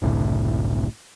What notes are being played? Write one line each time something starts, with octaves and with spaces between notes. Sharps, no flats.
F#1 C2 A2 D3